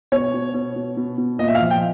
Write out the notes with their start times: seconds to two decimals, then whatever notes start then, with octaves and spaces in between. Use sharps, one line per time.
0.12 B2 C#5
0.34 B2
0.54 B2
0.76 B2
0.97 B2
1.18 B2
1.39 A#2 D#5
1.48 E5
1.55 F5
1.60 F3
1.71 G5